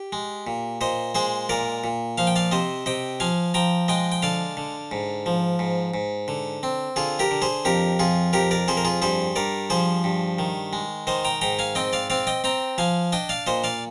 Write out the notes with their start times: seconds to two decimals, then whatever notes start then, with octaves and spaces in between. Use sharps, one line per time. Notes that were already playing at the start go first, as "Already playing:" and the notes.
Already playing: G4
0.13 G#3
0.47 A#2
0.81 A#2 C5 D#5
1.15 G#3 G#4 C5
1.49 A#2 A#4 D5
1.84 A#2
2.18 F3 F5
2.27 G5
2.36 D5 F5
2.51 C3 C5 D#5
2.86 C3 D#5 G5
3.20 F3 F5 G#5
3.54 F3 G5 A#5
3.88 G#3 D#5 G5
4.12 G5
4.22 D3 D5 F5
4.57 D3
4.91 G#2
5.26 F3
5.59 G#2
5.94 G#2
6.28 D3
6.63 C4
6.96 D3 F4 G#4
7.19 G4 A#4
7.31 D3
7.42 G#4 C5
7.65 F2 G4 A#4
7.99 F2 F4 G#4
8.33 F2 G4 A#4
8.51 A#4 D5
8.68 F2 G#4 C5
8.77 A#4
8.85 F4 G#4
9.02 G2 G#4 C5
9.36 G2 A#4 D5
9.70 F3 G#4 C5
10.04 G2
10.39 D#3
10.73 G#3
11.07 D#3 C5 D#5
11.25 G5 A#5
11.41 G#2 G5 A#5
11.59 F5 G#5
11.75 C4 D#5 G5
11.93 D5 F5
12.10 C4 D5 F5
12.27 D#5 G5
12.44 C4 G5 A#5
12.78 F3 F5 G#5
13.12 D4 D#5 G5
13.29 D5 F5
13.47 A#2 C5 D#5
13.64 D5 F5